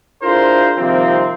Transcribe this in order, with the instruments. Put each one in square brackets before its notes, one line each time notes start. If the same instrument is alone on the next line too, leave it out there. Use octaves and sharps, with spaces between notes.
[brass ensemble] D4 E4 F4 G#4 A#4 C5
C3 D#3 F3 G3 A#3 C4